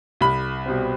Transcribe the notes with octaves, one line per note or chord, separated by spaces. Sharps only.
C2 B5
B2 G3 C4